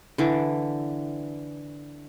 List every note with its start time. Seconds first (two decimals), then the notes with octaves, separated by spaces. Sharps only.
0.18 D3 E3 D6